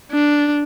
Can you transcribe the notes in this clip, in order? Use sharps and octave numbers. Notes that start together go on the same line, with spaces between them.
D4